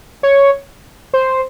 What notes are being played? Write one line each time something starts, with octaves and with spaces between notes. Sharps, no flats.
C#5
C5